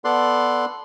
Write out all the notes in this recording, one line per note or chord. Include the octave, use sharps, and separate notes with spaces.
B3 A4 D5 C6 F#6